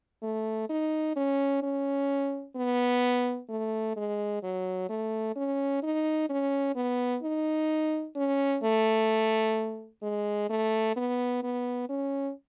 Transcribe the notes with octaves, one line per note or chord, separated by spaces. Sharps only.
A3
D#4
C#4
C#4
B3
A3
G#3
F#3
A3
C#4
D#4
C#4
B3
D#4
C#4
A3
G#3
A3
B3
B3
C#4